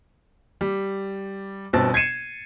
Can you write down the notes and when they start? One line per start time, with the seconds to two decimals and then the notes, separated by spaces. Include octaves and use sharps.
0.61 G3
1.73 G1 B2 C4 A5 E6 A6
1.94 G#6 C7 C#7 D#7 E7